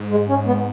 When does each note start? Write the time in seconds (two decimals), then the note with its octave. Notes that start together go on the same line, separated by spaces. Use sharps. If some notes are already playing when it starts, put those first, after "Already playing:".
Already playing: G#2
0.10 G#3
0.29 C#4
0.47 B3